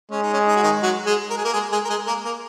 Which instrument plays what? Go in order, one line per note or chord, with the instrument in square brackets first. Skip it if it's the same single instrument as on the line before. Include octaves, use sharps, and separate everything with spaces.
[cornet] G#3 [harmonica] C#4
[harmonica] D#4
C#4
D#4
F#4
D#3 D#4
F#3 F#4
G#3 G#4
A#4
G#4
A#3 A#4
G#3 G#4
G#3 G#4
A#4
G#3 G#4
A#3 A#4
A#3 A#4